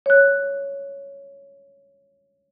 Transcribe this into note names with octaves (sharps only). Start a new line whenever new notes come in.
C#5 F#6